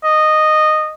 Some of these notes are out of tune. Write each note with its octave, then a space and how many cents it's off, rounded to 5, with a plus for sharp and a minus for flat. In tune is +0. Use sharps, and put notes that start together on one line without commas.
D#5 -10